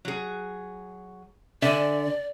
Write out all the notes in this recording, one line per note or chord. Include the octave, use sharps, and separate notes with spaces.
F#3 G#4
D3 D5 E5 G#5